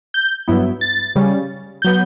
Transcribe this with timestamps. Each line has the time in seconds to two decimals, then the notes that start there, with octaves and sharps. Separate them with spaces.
0.14 G6
0.48 G2 F#3 B3 E4
0.81 A6
1.15 C#3 G3 C#4
1.82 F#3 B3 G6